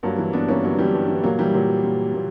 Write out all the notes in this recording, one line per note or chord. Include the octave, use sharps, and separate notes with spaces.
G2 F#3 A#3
E3
G2 B3 D4
E3 A#3 C#4
G2 F#3
E3 G3
G2
E3
A#2 F#3 A#3
E3 G3
A#2 F#3
A#2
A#2